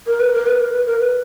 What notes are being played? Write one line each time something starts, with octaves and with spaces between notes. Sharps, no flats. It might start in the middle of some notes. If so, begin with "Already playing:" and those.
A#4
B4
A#4
B4
A#4
B4
A#4
B4